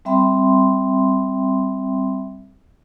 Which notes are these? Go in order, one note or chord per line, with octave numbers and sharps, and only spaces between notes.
G3 C4 E5 G5 B5 C6